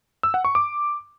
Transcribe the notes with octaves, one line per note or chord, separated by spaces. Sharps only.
E6
F#5
C#6
D6